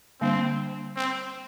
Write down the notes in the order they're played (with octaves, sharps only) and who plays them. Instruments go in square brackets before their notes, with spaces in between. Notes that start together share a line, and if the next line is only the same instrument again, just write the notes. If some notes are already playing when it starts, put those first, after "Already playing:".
[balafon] D3 G3 A#3 D4 [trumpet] C4
[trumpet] C4